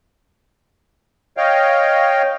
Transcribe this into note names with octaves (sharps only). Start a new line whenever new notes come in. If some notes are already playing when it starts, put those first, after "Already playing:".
C#5 D#5 F5 G5